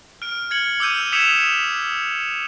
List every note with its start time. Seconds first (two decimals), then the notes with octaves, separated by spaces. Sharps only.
0.22 F6 D7
0.51 F6 G#6 C#7 F#7
0.80 D6 E6 G6 D#7
1.12 D#6 G#6 B6 C#7 E7 F7